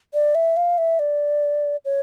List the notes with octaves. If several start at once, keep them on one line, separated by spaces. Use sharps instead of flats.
D5
E5
F5
E5
D5
C#5